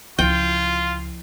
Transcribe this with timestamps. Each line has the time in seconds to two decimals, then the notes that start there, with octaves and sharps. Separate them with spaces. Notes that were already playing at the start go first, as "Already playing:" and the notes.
0.19 C#2 F3 E4 F4 G5